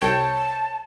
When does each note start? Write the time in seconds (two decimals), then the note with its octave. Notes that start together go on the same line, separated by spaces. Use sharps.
0.02 C2 C#5 G5 A5